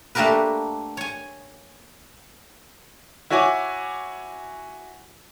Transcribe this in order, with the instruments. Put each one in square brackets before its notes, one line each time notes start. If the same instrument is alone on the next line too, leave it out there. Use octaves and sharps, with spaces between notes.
[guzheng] A3 A#3 D4 G4 A#4 B4
C#5 G#5
[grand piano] E4 F#4 C#5 G#5 D6